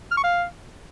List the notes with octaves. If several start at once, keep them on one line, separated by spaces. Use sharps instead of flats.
F6
C#6
F5